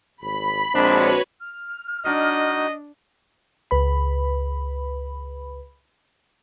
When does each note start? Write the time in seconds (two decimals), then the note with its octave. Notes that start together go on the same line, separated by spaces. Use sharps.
0.22 G#1 B5
0.74 A#1 G#3 C4 D4 F#4 B4 C#5
1.40 F6
2.05 D4 D#4 F#4 D#5
3.71 C#2 B4 B5